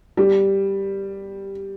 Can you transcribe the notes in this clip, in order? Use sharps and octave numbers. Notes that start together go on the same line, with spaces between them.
G3